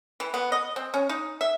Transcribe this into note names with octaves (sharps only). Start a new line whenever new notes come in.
E3
B3
D#5
C4
C#4
D#4
E5